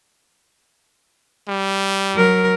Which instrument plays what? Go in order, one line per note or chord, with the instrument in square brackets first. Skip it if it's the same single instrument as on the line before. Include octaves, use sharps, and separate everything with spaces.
[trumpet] G3
[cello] F#3 A#4